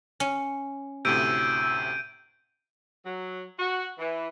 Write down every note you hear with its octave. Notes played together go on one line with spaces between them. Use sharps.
C#4
D2 A2 C3 E6 G6 D7 D#7
F#3
F#4
E3